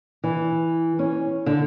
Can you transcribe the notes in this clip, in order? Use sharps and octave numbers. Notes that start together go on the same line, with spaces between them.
E3
C#4
D3